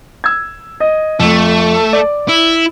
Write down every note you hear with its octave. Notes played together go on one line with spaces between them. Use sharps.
E6 G#6
D#5
F2 A3
D5
E4